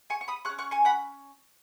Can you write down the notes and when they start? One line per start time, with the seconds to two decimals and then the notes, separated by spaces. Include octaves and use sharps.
0.10 G#5 C#6
0.21 C#6
0.28 B5 D#6
0.45 G#4 C#6 F#6
0.49 C#4
0.58 C#6 F#6
0.71 G#5 C#6
0.85 F#5 B5